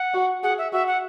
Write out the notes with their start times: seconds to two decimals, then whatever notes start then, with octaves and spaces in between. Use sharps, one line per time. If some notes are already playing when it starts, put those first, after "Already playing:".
Already playing: F#5
0.14 F#4
0.43 G#4 F#5
0.58 E5
0.72 F#4 E5
0.87 F#5